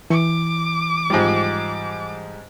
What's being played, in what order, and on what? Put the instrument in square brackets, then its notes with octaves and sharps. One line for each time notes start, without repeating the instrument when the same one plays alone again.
[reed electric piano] E3 [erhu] D6
[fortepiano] G#2 F3 G3